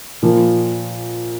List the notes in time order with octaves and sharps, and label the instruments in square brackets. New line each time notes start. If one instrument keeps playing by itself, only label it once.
[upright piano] A#2 F3 A#3